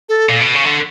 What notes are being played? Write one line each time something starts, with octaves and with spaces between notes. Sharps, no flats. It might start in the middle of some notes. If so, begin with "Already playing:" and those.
A4
A#2
B2
C#3
D3